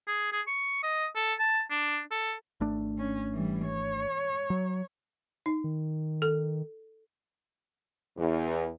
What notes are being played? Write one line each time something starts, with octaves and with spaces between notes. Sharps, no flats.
G#4
G#4
C#6
D#5
A4
A5
D4
A4
G#1 A3 D4
C#4
E3 G3
C#5
F#3
D#4
D#3
A4
E2